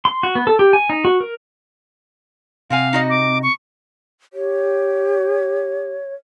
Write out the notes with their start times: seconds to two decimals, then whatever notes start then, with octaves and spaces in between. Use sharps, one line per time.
0.05 C6
0.23 F#4
0.35 B3
0.47 A4
0.59 G4
0.73 G#5
0.90 D#4
1.05 F#4
1.20 A#4
2.70 C3 C4 F5 F#5 G#5
2.93 D#4 F#4 D#5
3.10 D6
3.43 C#6
4.33 G4 C#5